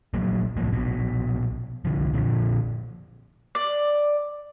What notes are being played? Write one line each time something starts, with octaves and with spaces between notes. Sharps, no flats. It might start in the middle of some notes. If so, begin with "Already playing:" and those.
A#1 F#3 A#3
C2 A2 F3 A#3
A#1 B2
C2 D3 F3
A#2 D3 D#3 F3
D5